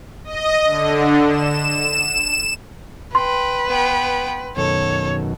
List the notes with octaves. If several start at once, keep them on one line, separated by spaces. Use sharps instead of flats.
D#5
D3
E7
B4 G5 C6
B3 G5
F#2 B2 D#3 A4 C#5